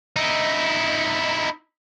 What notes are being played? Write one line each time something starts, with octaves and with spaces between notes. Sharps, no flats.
D#4 E4